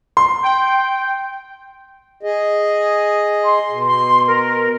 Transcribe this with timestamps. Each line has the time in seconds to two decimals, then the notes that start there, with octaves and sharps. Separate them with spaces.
0.17 C6
0.43 G5
2.23 G#4 D#5
3.44 C6
3.70 B2
3.86 C6
4.27 A#4